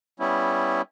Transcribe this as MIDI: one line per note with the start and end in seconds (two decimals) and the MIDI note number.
0.20 0.82 55
0.20 0.82 59
0.20 0.82 61
0.20 0.82 64